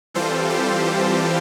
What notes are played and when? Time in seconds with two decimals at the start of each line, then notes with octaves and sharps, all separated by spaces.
0.14 E3 G3 C4 F4 A4 C5
0.50 G4